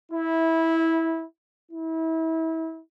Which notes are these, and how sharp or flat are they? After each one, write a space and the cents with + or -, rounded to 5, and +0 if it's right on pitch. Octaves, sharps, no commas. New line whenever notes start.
E4 -15
E4 -30